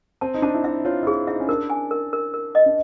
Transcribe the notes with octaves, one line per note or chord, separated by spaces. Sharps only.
C4 A5
D#4
D4 A5
E4
D#4 E5
F4 C#5
E4
F4 G#4
D#4 E5
C#4
D4 A#4
G#5
A#4
A#4
A#4
D#5
D4